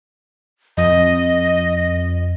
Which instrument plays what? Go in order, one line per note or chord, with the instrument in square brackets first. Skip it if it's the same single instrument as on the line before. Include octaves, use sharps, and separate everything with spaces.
[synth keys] F2 [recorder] D#5